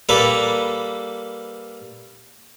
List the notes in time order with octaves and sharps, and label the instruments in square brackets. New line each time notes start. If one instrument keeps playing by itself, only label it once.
[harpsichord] G3 A#3 A4 B4